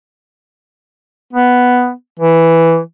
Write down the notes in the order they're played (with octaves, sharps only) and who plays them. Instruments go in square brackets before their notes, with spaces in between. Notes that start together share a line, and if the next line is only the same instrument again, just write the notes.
[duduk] B3
E3